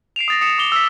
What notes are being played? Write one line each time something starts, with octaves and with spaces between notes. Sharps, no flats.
C7 D7 E7 F7
D#6 A6 A#6
D#6 C#7 E7 F7
D6 F7 G7
E6 B6